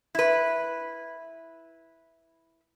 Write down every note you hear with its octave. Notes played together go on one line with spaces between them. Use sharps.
E4 B4